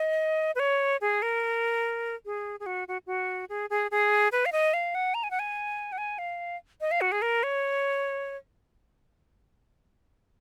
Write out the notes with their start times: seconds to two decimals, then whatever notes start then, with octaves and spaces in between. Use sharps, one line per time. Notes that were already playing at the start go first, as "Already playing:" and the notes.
Already playing: D#5
0.55 B4
0.59 C#5
1.01 G#4
1.22 A#4
2.26 G#4
2.60 G#4
2.66 F#4
2.88 F#4
3.07 F#4
3.49 G#4
3.70 G#4
3.91 G#4
4.32 B4
4.46 F5
4.52 D#5
4.74 F5
4.95 F#5
5.14 A#5
5.23 G#5
5.31 F#5
5.39 G#5
5.92 F#5
5.98 G#5
6.18 F5
6.81 D#5
6.91 F5
7.01 F#4
7.12 G#4
7.22 A#4
7.43 C#5